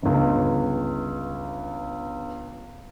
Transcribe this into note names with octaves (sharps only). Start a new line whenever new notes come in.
G1 C#2